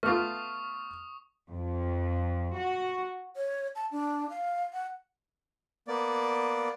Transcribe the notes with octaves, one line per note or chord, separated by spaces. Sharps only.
A3 B3 F4 C#6 D#6 F6
F2
F#4
C#5
A5
D4
F5
F#5
A#3 B3 D5